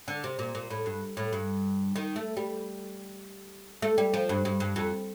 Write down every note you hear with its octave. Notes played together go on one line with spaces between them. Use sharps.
D3
C3
A#2
A#2
A2
G2
A2
G2
D#3
A3
G3
A3
G3
F3
G2
G2
G2
F2